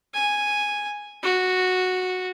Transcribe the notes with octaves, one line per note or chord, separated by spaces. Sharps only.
G#5
F#4